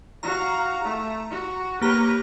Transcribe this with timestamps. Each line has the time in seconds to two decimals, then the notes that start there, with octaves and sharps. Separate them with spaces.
0.23 F#4 F5 A#5
0.84 A3
1.31 F#4
1.81 A#3 G4 B4 C#5 A#5